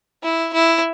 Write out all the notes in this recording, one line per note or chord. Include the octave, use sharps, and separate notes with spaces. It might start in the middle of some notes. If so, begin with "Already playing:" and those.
E4
E4